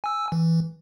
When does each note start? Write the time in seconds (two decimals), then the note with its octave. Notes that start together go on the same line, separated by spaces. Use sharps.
0.04 G#5 E6
0.32 E3